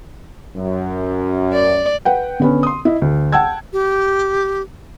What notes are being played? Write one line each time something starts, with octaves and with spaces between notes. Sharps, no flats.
F#2
D5
B4 F#5 G5
D3 B3 C#4
C6 D#6
E4 D#5
D2
F#5 G5 A5 E6 G#6
G4